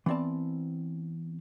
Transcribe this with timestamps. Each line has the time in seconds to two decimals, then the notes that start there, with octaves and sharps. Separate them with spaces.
0.06 E3 B3 C4 D5 A5